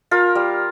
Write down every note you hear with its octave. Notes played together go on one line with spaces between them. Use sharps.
F4 A#4
G3